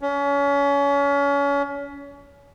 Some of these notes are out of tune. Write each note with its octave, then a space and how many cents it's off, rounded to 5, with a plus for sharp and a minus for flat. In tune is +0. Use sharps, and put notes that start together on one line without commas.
C#4 +30